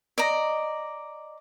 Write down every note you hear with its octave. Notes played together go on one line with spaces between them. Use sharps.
D5 D#5 A#5